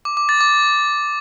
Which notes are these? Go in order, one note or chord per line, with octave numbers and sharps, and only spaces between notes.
D6
D6
A6
D6